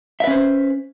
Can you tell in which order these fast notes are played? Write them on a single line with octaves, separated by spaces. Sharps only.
E5 B4 C#4 C5